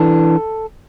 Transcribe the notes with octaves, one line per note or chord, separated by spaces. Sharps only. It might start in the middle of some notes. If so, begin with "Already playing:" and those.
Already playing: E3 D4 A4